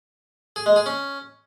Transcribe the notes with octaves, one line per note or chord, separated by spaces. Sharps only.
G#4
G#3
G#4
C#4